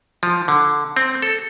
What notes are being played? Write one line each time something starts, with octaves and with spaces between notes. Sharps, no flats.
F3
D3
C4
A4